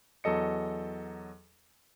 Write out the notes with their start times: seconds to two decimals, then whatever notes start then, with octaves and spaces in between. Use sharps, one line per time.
0.24 E2 F#3 A4 D#5 C#7